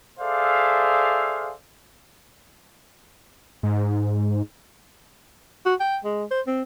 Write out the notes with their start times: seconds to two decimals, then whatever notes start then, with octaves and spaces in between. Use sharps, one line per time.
0.20 G#4 A4 C5 D5 E5 F5
3.63 G#2
5.65 F#4
5.80 G5
6.04 G#3
6.31 C5
6.47 C4